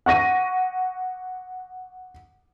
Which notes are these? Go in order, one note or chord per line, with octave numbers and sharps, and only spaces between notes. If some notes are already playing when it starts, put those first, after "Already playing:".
F#5 C#6 A#6 D#7